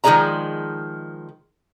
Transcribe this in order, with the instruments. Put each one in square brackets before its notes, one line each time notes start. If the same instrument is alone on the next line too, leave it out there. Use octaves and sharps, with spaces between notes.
[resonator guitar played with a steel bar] D#3 F3 G#3 G#4 D5 A#5